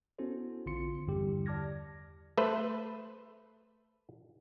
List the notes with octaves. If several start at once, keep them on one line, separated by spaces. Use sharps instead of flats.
B3 C#4 E4 F#4 A4 C5
A#1 D3 C4 F4 C6 C#7
E2 G2 D3 G3 E4 G4
D5 A5 D6 F6 G#6 A#6
A3 B4 C5